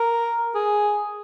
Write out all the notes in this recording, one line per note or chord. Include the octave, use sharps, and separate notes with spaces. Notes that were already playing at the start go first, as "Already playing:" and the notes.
Already playing: A#4
G#4